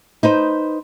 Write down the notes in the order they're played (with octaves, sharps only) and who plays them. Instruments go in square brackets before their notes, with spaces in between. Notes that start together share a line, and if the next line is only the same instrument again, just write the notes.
[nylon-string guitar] D#4 B4 C5